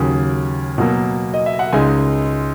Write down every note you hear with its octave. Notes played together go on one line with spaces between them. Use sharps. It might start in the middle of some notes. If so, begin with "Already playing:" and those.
Already playing: D#2 C#3 F#3
B2 F#3 A#3
D#5
E5
F#5
C#2 C#3 G#3 D#4 G#5